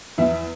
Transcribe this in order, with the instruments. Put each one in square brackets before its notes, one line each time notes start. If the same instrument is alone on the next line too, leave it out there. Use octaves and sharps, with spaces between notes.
[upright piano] E2 E4 E5